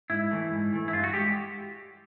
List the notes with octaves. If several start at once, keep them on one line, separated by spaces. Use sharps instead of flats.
G#2 E4
E3 A3
G#2
E3 A3
E4
G2 F4
F#4
G#3 G4